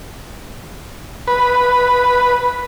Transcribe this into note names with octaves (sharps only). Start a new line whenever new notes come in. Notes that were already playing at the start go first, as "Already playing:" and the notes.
B4